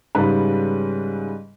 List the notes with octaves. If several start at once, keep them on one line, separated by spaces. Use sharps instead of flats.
G#2 C#3 G3 B4